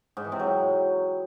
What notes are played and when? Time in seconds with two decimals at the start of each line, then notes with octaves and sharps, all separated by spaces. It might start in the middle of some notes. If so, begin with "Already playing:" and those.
0.17 G#2
0.24 E3
0.32 C3
0.40 F#3